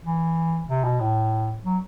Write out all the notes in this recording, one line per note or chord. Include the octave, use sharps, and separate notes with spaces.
E3
C3
B2
A2
F#3